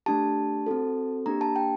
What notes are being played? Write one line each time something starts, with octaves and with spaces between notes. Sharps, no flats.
A3 D4 G4 A5
C4 F#4 A4
A#3 D4 G4 A#5
A5
G5